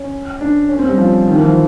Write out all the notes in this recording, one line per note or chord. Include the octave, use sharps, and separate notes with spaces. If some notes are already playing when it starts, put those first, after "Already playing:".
Already playing: C#4
D4
C#4
C4
G3
F3
D#3
E3
F3